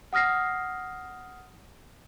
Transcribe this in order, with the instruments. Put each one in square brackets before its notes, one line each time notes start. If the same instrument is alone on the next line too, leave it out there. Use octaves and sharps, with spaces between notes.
[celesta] F#5 D#6 F6 A#6 C7